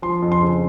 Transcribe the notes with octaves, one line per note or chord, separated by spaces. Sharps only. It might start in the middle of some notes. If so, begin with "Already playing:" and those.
F3 C6
F2
C6
C#3